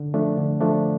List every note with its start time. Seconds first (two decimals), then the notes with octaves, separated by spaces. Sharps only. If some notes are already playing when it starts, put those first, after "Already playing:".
Already playing: D3
0.14 F3 A3 D4
0.37 D3
0.60 F3 A3 D4